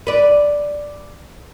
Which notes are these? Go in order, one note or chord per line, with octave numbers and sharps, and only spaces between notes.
B4 D5